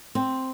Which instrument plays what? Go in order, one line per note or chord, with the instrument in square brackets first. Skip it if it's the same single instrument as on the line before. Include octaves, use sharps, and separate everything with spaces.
[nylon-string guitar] C4